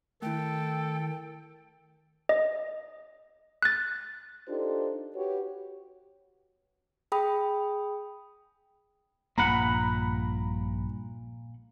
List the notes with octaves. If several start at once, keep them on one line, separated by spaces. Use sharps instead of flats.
D#3 A3 E4 A4 G5
D#5
F#6 A6
D4 D#4 F4 G4 A4 C5
F#4 G4 B4 C#5
G#4 G5 B5 D#6
A#1 G2 A#2 A#3 F#5 A#5 B5